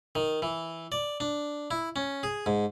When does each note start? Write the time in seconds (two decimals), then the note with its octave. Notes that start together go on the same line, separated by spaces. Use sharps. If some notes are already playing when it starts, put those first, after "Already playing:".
0.15 D#3
0.42 E3
0.92 D5
1.20 D4
1.71 E4
1.96 C#4
2.23 G#4
2.46 G#2